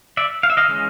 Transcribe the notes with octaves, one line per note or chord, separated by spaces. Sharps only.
D5 E5
F5
E5
D#5 F5
E3 G#3 C#4